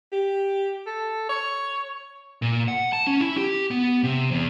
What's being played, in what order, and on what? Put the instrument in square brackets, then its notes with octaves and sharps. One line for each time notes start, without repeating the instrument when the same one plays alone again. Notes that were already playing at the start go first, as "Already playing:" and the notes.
[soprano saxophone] G4
A4
C#5
[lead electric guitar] A#2
F#5
A5
C#4
E4
G4
B3
C3
E2